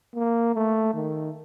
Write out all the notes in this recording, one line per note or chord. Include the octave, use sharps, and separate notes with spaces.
A#3
A3
D#3